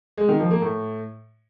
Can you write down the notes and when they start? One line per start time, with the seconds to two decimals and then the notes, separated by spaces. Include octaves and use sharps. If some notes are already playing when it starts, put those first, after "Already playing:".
0.17 G#3
0.29 D#3
0.40 F3
0.51 A#3
0.62 A2